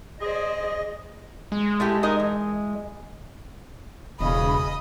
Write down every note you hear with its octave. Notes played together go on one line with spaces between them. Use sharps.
G#4 C5 D5 D#5
G#3
A3 E4 G4
D#4 A#4 D#5
E3
E1 C#3 D#5 B5